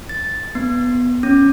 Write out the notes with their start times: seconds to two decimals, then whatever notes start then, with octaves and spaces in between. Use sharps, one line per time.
0.09 A6
0.55 B3
1.23 C#4